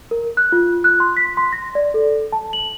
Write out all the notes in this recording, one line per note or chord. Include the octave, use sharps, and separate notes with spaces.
A#4
F#6
F4
F#6
C6
B6
C6
A#6
D5
A4
A5
F#7